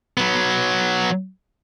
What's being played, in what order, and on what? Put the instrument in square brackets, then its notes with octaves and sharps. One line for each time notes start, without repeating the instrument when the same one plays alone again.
[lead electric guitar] F#3 B3